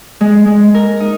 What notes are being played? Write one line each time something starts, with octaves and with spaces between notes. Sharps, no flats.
G#3
G#3
A#4
D#4